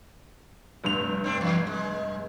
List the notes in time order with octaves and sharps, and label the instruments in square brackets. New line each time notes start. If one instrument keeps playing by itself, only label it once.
[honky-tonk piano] F1 G2 F7
[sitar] C4 D4
E2
G#3